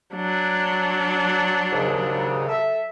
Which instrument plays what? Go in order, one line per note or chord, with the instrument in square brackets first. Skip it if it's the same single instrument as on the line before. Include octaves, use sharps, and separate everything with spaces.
[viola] F#3 D4
[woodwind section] D#2 G#2 C#3
A4 E5